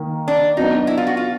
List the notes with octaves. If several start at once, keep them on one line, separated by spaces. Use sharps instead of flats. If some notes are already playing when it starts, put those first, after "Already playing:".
Already playing: D#3 A#3
D4
F#3 B3 D4 D#4
E4
F4
F#4
F4